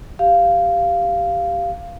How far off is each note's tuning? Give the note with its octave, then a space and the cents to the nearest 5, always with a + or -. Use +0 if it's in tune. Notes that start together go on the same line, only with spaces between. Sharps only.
G4 +0 F5 -10